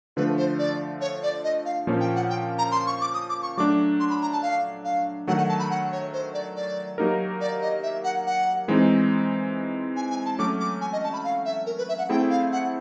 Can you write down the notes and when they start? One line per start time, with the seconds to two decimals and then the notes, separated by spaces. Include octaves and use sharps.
0.17 D3 F3 A3 B4
0.37 C5
0.59 D5
1.01 C#5
1.23 D5
1.44 D#5
1.65 F5
1.87 A#2 F3 A#3 C#4
2.00 G5
2.16 F#5
2.29 G5
2.58 A#5
2.71 C6
2.87 C#6
3.01 D6
3.14 D#6
3.29 D6
3.42 C#6
3.57 F#3 A3 D4 D6
4.00 C6
4.10 B5
4.22 A#5
4.32 A5
4.42 F5
4.84 F5
5.27 D#3 F#3 A3 F#5
5.38 F#5
5.49 A5
5.59 B5
5.70 F#5
5.92 C#5
6.13 C5
6.33 D5
6.56 D5
6.98 F#3 A#3 D#4 G4 A#4
7.40 D5
7.62 D#5
7.83 E5
8.04 F#5
8.26 F#5
8.68 E3 G#3 C4 D#4
9.96 G#5
10.10 G#5
10.25 A5
10.39 F#3 A3 C#4 F#4 D6
10.60 D6
10.81 G#5
10.93 D#5
11.03 A5
11.13 B5
11.24 F5
11.45 E5
11.66 A#4
11.78 B4
11.89 E5
11.98 F#5
12.09 A3 C4 E4 G#4 G5
12.30 F5
12.52 F#5